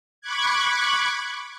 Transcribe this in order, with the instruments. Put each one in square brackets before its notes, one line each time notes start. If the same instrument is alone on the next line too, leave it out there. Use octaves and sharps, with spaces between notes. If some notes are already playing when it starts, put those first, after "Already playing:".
[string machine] B5 C#6 D6 F#6 G#6